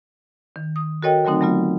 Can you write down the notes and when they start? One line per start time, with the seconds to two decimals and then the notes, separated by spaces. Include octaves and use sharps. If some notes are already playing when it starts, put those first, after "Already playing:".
0.56 D#3
0.76 D#6
1.03 F#4 A4 A#4 C#5 D#5 G5
1.25 D3 F#3 A3 C4 D#4
1.41 F#3 A3 B3 F4